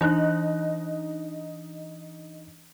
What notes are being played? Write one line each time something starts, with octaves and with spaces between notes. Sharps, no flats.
E3 D4 D#4 D#5 F#6